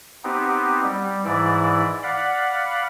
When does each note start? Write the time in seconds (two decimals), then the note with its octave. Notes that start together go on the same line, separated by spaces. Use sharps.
0.24 B3 C4 D#4 G4
0.84 G3
1.25 G#2 E3 E4 D5
2.03 D5 F5 F#5 B5